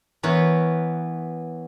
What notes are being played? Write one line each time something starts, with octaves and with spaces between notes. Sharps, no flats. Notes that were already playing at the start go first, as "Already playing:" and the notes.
E3 B3 A#4 C#5